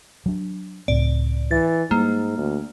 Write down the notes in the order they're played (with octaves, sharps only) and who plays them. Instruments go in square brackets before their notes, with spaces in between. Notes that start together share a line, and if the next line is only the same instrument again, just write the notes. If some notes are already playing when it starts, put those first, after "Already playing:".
[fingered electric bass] F#3 D4
[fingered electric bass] C#2 A2 C4 [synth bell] D5
[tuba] E3 [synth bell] A6
[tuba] G#2 [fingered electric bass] G3 [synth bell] A#3
[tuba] D2